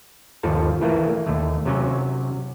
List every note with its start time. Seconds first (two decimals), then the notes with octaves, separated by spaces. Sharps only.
0.43 G1 D#2 F3 A4 A5
0.81 E3 A3 A#3
1.26 D#2 A3
1.65 C3 F#3 C#4